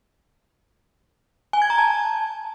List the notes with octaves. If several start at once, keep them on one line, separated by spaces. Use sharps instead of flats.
G#5
G#6
A#5
A5